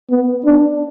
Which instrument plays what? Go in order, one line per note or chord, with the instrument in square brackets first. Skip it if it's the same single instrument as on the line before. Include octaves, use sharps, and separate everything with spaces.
[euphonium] B3
D4